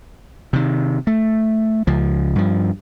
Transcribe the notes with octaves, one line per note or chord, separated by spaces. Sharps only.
C3 D#3
A3
C#2 F3
G2 F3